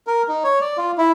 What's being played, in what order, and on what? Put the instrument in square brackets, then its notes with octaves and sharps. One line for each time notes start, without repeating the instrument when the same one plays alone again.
[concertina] A#4
D#4
C#5
D5
F4
E4